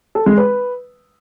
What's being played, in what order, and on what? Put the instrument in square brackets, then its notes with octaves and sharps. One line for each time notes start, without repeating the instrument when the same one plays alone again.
[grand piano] A4
G#3
B4